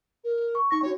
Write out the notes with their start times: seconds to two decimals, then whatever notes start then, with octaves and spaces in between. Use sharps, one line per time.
0.24 A#4
0.55 C#6
0.71 D#4 C#6 A#6
0.83 D4 F#4 C#5